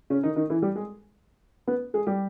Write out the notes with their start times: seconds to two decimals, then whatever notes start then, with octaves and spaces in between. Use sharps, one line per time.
0.10 C#3 C#4
0.23 D#3 D#4
0.36 D#3 D#4
0.50 E3 E4
0.62 G3 G4
0.75 G#3 G#4
1.67 B3 B4
1.94 G#3 G#4
2.07 G3 G4